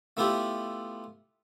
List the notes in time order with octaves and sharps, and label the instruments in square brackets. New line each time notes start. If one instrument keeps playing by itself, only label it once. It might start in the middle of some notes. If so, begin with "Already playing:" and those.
[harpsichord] A3 B3 E4 F4 G4